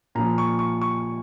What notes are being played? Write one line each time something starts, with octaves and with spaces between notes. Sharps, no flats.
A#2 F3 A#5
C#6
C#6
C#6